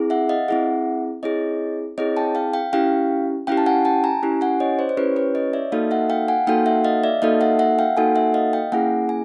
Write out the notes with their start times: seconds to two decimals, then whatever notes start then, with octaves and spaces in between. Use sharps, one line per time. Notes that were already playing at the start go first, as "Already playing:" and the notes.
Already playing: C4 E4 G#4
0.10 E5 F#5
0.29 D#5 F5
0.48 C4 E4 G#4 E5 F#5
1.23 C4 E4 G#4 C#5 D#5
1.98 C4 E4 G#4 C#5 D#5
2.17 G5 A5
2.35 F5 G5
2.54 F5 G5
2.73 C#4 E4 G4 F5 G5
3.47 C#4 E4 G4 F5 G5
3.57 A5
3.66 F#5 G#5
3.85 G5 A5
4.04 G#5 A#5
4.23 C#4 E4 G4
4.41 F#5 G#5
4.60 C#5 D#5
4.79 C5 D5
4.89 C5
4.97 C#4 E4 G4 B4 C#5
5.16 B4 C#5
5.35 C#5 D#5
5.53 D5 E5
5.72 A#3 D#4 F#4 A4 D#5 F5
5.91 E5 F#5
6.10 F5 G5
6.28 F#5 G#5
6.47 A#3 D#4 F#4 A4 F5 G5
6.66 E5 F#5
6.84 D#5 F5
7.04 D5 E5
7.22 A#3 D#4 F#4 A4 D#5 F5
7.41 E5 F#5
7.59 E5 F#5
7.79 F5 G5
7.97 A#3 D#4 F#4 A4 F#5 G#5
8.15 E5 F#5
8.34 D#5 F5
8.53 F5 G5
8.72 A#3 C#4 E4 G#4 F#5 G#5
9.09 G#5